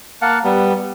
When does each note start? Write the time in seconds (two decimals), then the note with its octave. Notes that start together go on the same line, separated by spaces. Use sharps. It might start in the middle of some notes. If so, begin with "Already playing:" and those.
0.22 A#3 F5 F#5 A5
0.44 G3 B3